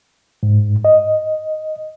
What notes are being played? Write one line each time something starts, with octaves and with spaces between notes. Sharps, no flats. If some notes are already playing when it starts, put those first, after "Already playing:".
G#2
D#5